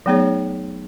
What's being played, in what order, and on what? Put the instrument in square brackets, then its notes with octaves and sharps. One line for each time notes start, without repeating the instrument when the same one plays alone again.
[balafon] F#3 A3 B3 D#4 G#4 C#5